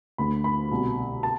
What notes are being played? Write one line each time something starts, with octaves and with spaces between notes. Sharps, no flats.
D2 D3 B5
B5
C2 B2
A5